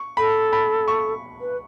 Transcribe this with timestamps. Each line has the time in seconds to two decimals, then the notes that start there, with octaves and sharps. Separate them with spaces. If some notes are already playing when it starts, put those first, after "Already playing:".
Already playing: C#6
0.17 A4 B5
0.53 B5
0.88 C#6
1.40 B4